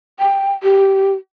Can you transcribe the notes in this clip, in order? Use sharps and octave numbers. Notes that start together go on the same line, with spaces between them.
G5
G4